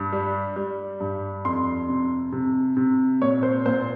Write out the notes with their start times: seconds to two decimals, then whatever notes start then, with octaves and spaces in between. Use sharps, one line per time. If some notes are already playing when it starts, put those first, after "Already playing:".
Already playing: G2
0.12 G3
0.56 G3
1.00 G2
1.45 F2 C6
1.89 C3
2.32 C3
2.77 C3
3.22 A#2 C#5
3.43 C5
3.66 A#2 C5